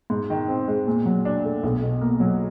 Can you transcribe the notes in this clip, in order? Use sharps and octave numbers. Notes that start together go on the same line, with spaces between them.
G#2
D#3
C4
G#3
A#2
F#3
D4
A3
B1
B2
A#3
F#3